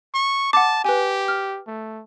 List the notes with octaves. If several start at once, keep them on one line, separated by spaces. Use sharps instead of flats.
C#6
F#5 A5 D6
G4 B4 G#5
F6
A3